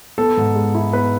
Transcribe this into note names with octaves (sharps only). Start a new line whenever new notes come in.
B3 A4
G#2
G#3
E4
B3 B4